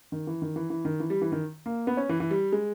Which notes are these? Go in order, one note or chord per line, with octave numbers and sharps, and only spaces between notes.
D#3
E3
D#3
E3
E3
D#3
E3
G3
E3
D#3
A#3
B3
C#4
E3
E3
G3
G#3